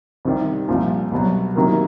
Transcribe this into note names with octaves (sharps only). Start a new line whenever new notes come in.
C2 C3 D#3 G3
C2 A#2 F3
C2 B2 F#3
C3 D#3 F#3 A#3